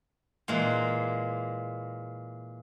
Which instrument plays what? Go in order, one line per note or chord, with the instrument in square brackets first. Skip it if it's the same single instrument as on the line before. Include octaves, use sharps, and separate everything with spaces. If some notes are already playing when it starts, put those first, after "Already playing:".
[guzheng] A#2 E3 G#3 A#3